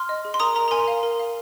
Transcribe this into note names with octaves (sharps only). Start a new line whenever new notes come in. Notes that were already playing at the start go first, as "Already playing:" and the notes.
Already playing: C6 F6
D#5
G#4
C6
A#4 A#5 D#6
A#4 A#5
A#5
A#4 G#5 C6
F5
A#4
F5